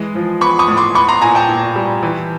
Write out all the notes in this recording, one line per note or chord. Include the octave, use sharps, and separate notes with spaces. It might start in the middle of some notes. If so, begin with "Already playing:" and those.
Already playing: E3 G#3
F3
B3 B5 C#6
C#6 D#6
A2
C6 D6
B3 B5 C#6
A#5 C6
A#2 G#5 A#5
G5 A5
A#2
G3
E3